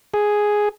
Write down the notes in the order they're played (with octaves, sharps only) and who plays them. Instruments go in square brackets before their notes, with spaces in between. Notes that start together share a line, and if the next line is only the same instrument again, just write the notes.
[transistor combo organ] G#4